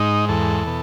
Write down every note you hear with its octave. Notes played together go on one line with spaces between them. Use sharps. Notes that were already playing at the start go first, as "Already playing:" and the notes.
Already playing: G#2 D#4
E2 A4
B2